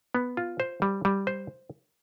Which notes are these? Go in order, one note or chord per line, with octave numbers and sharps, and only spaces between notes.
B3
F4
C5
G3
G3
C5